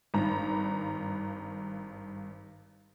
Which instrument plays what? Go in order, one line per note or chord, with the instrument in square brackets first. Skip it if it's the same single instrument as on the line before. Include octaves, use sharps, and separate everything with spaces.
[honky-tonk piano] G#1 G2 A#5